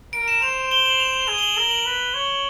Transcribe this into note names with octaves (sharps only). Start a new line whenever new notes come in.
A#4 D7
E7
C5 F7
G7
F#7
F7
F7
G#4 F7
G7
F#7
A#4 G7
F#7
B4
C#5